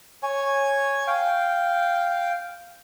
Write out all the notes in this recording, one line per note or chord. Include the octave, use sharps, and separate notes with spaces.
C#5 G#5
F5 G5